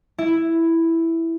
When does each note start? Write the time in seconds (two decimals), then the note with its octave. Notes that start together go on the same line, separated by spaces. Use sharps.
0.18 E4